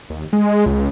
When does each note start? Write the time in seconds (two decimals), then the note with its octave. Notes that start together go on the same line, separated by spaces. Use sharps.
0.10 D#2
0.33 G#3
0.66 C#2